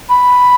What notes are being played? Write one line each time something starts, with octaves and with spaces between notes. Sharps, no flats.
B5